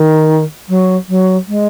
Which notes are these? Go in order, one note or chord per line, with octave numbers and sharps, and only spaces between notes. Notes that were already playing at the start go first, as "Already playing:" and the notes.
Already playing: D#3
F#3
F#3
G#3